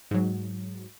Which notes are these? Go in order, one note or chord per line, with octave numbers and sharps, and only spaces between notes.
G#2 F#3